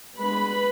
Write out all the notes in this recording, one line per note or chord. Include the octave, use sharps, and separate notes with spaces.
G#3 B3 D4 B4 B5